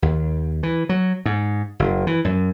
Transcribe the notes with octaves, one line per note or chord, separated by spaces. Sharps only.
D#2
E3
F#3
G#2
F#1
E3
F#2